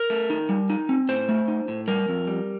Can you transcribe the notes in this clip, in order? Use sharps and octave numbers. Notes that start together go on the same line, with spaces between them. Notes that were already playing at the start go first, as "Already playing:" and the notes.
Already playing: A#4
A3
D#4
G3
D#4
C4
A2 C5
A3
D#4
A2
G3 A#4
F2
G3